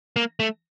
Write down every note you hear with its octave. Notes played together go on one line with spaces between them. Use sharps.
A#3
A3